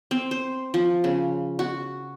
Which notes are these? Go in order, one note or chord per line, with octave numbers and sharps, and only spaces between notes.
C4
C5
F3
C#3
F#4